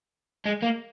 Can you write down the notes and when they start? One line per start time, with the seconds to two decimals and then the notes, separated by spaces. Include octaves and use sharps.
0.46 G#3
0.63 A#3